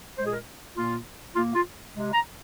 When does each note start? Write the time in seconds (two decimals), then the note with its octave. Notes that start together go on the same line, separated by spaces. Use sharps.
0.18 A#2 G#3 C5
0.26 G#4
0.33 A#4
0.77 A#2 A#3 F4
1.36 A#2 A#3 F4
1.55 F4
1.94 C3 G#3
2.13 A#5